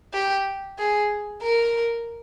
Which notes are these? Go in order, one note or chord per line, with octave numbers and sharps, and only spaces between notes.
G4
G#4
A#4